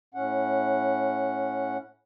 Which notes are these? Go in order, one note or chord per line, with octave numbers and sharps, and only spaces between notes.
A2 C#4 F#5